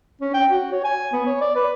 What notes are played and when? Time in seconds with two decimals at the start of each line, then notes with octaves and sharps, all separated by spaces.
0.21 C#4
0.34 G5
0.51 F#4
0.72 C#5
0.84 G#5
1.13 B3
1.26 C#5
1.41 D5
1.56 B4